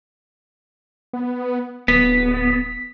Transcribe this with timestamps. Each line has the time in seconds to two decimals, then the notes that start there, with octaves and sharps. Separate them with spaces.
1.13 B3
1.88 D1 B3 B6